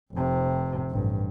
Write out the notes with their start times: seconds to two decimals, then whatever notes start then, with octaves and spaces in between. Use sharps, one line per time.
0.13 F1 C3
0.91 A1 G2